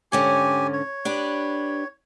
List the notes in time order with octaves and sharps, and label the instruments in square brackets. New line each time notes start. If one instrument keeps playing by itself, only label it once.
[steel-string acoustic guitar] G#2 D3 C#4 [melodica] G4 G#5
[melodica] C#5
[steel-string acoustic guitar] D4 G4 B4